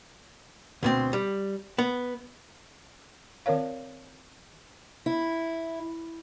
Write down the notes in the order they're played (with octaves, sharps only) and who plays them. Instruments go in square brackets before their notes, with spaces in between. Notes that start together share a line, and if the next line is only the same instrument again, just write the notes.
[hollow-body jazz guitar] D2 B2 C4
G3
B3
[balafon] D#3 C4 A#4 C#5 F5
[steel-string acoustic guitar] E4